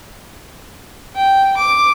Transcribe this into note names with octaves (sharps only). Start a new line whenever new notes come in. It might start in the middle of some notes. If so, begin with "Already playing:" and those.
G5
D6